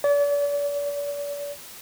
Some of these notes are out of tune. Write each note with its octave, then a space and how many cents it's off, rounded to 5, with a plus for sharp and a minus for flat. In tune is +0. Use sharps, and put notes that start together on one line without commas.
D5 -40